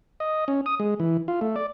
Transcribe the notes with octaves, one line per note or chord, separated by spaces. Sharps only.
D#5
C#4
D#6
G#3
E3
F4
A3
D5